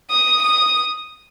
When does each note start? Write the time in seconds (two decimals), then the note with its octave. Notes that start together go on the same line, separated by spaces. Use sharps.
0.11 D#6
0.43 D#6